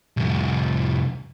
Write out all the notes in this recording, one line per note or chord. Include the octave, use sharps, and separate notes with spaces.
C2 F2